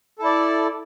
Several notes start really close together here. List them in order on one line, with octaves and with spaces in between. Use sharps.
A4 E4 D5